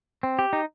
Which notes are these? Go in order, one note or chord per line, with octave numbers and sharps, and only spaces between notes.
C4
G4
D#4